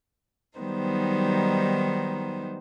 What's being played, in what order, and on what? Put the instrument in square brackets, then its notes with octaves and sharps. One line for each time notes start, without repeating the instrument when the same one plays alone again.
[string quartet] D#3 F#3 G3 B3 D#4 C5